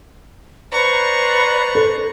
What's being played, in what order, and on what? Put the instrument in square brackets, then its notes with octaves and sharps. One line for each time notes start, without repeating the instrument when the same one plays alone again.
[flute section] B4 C5 D5 [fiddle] A#5 C#6
[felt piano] A4